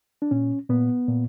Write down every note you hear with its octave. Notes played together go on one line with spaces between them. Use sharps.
D4
A#2 C#4
A#2 B3
A#2